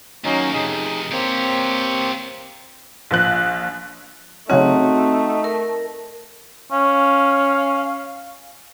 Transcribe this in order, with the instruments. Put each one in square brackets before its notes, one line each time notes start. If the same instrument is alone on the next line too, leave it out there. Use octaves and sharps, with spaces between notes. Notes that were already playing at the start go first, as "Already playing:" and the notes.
[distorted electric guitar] D#2 A#3 [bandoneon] F#3 C#4 D#4
[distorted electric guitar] F2 C3 [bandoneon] D#4 G#4
[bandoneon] A#3 C4 [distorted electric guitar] G4 C#5
[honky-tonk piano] A#1 F3 F#6
[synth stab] C#3 F#3 C#4 [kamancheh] A3 [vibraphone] C4 F#4 F#5 [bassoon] D#4
[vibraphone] A#4
[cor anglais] C#4 [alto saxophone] F5